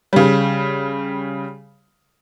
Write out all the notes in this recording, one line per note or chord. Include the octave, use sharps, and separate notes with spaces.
C#3 G3